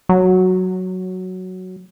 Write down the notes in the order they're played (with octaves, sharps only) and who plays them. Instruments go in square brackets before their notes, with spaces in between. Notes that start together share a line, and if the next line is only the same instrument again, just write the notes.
[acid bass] F#3